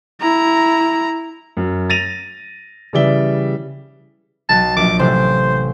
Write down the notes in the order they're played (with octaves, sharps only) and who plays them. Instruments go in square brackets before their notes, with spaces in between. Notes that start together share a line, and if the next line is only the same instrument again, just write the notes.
[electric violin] E4 A#5
[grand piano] F#2
A6 A#6 D#7 F7
C#3 E3 G3 D5 E5 G7
[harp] B1 F#3 [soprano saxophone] A5
[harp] A#1 [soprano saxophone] D6
[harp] A1 C3 [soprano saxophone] C5